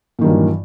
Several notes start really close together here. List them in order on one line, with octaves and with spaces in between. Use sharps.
A#2 D#3 G2 F#3 E3